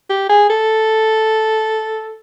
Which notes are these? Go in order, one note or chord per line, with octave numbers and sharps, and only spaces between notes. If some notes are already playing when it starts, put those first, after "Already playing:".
G4
G#4
A4